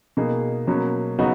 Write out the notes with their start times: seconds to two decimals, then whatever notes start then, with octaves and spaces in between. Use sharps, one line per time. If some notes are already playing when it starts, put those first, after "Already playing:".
0.17 B2 A#3 D#4 G#4
0.67 B2 F#3 A#3 C#4
1.18 C#3 F#3 B3 D#4 F#4